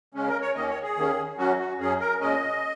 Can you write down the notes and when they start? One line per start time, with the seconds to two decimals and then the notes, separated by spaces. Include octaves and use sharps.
0.14 C#3 G#3 C#4
0.28 A#4
0.42 C#5
0.55 D#2 D#3 A#3 C#4 D#5
0.69 C#5
0.83 G#4
0.97 D#2 D#3 A#3 C#4
1.38 F#2 F#3 C#4 F#4
1.59 F#4
1.79 F#2 F#3 C#4 G#4
2.00 A#4
2.20 A#2 G#3 C#4 D#5